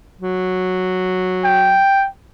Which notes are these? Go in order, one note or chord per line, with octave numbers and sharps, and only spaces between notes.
F#3
G5